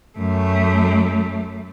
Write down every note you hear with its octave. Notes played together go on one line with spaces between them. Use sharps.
F#2 A3